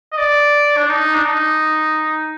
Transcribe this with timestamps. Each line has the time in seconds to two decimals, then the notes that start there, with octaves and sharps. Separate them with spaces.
0.12 D#5
0.18 D5
0.77 D4
0.89 D#4
1.14 D4
1.25 D#4